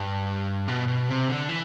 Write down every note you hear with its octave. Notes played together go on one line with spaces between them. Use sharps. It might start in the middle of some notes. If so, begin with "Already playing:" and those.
Already playing: G2
B2
B2
C3
D3
E3